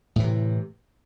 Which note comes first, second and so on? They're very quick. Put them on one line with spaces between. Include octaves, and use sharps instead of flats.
A2 E3 C3